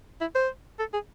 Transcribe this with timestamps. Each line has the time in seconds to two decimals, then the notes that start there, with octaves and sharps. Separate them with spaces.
0.21 E4
0.35 C5
0.79 A4
0.93 G#4